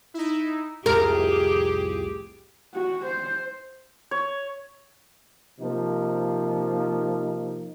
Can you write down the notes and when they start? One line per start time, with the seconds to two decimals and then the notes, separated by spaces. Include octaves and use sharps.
0.14 D#4 E4
0.86 C2 F2 A2 G4 G#4 A#4
2.74 F#4
3.05 C5
4.11 C#5
5.60 C3 F3 A#3 D#4